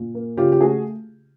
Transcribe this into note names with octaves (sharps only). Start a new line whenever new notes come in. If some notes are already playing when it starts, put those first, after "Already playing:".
Already playing: A#2
A#3
C#3 F4 G4
G4
A3 F#4 G#4